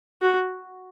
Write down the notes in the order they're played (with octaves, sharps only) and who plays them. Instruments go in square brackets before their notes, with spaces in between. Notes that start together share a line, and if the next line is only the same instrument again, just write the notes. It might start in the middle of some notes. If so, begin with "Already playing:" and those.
[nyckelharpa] F#4